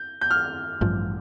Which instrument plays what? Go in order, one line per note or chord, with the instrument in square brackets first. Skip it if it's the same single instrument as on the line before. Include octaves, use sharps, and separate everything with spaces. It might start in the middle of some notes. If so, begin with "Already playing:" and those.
Already playing: [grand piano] G6
G6
F6
[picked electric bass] A1 G2 F3